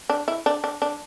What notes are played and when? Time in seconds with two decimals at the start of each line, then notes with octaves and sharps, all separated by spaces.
0.09 D4
0.28 E4
0.46 D4
0.64 D4
0.82 D4